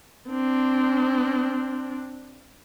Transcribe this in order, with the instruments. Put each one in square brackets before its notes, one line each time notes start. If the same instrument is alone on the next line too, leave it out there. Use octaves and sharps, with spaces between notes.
[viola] C4 D4